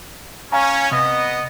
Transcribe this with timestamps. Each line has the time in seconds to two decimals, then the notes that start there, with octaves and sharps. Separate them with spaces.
0.52 C#4 F5 G#5 A#5
0.91 C3 B3 D#5